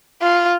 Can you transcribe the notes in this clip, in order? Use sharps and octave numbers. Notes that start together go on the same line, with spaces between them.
F4